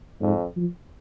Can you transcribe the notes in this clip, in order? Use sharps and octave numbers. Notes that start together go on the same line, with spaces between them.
F2 G#2
F3